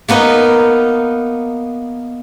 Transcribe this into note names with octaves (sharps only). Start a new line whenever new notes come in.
A#3 B3 D#4 D#5